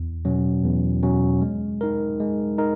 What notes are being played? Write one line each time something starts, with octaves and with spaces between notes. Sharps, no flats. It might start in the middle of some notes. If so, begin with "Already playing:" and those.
Already playing: E2
B2 F#3 C#4
E2
B2 F#3 C#4
G#3
D#4 A#4
G#3
D#4 A#4